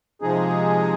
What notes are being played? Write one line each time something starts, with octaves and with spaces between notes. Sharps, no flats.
C3 F3 G#3 D#4 G#4